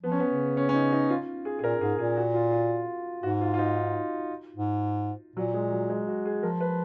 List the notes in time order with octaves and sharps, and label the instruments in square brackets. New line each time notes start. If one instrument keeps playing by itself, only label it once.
[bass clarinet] F3 [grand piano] B3
[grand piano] C#4
B3
[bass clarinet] C#3
[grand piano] C#4
C#4
D#4
D#4
F4
G#4
G#4
[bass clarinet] A#2 [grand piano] A#4
[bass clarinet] G#2 [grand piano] G#4
[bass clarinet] A#2 [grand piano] G#4
[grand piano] F#4
F4
F4
[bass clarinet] G#2 [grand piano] F#4
[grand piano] F4
F4
D#4
[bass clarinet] G#2
[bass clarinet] A#2 [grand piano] F#3
[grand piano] G#3
F#3
G#3
F#4
G#4
[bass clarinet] F3 [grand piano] A#4
[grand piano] B4